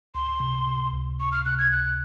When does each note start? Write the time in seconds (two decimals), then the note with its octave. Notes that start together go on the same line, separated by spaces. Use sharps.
0.15 C#2 C6
0.40 C3
0.67 C3
0.93 C#2
1.20 C#2 C#6
1.32 F6
1.45 C3 F#6
1.58 G#6
1.72 C#2 F#6